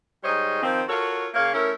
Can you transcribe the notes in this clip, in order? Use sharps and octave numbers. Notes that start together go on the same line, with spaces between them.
G#2 G3 C5 C#5 D#5
D#3 F3 C4
F4 F#4 A4 A#4 C#5
C#3 A#3 C#5 F5
A3 C#4 E4 A#4